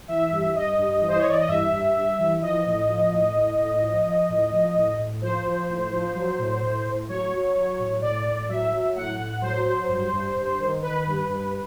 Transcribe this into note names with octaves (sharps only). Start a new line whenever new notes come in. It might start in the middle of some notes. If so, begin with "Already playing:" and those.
E3 E5
G2
G2 D#5
G2
E3
C5
C#5
E3 D5
D#5
G2 E5
G2
G2
E3
F3 D#5
A2
F3
A2
A2
A2
F3
F3
A2
F3
A2
A2
F3 C5
F3
A2
F3
F#3
A2
A2
A2
F#3 C#5
F#3
F#3
A2
A2 D5
A2
F#3 E5
F#3
A2 F#5
A2
F#3 C5
F#3
G2
G2
G2
D#3
D#3 B4
G2
G2 B4